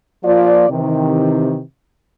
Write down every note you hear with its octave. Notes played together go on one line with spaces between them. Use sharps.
F3 A#3 F4 D5
C3 D#3 E3